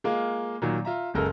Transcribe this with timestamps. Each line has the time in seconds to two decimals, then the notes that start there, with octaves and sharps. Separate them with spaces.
0.04 G#3 A#3 F4
0.62 A#2 D#3 F#3
0.85 F4 E5 A#5
1.14 F#1 C#2 G#3 A4 A#4 F6